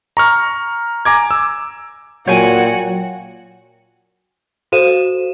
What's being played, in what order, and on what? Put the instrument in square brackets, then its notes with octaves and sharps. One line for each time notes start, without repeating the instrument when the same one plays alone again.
[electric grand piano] A#5 C#6 F6
G#5 A#5 D6 G#6
E6
[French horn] A#2 [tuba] F#3 [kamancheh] F#4 [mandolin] C#5 G5 G#5
[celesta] F#4 A4 C5 F5 D#7 E7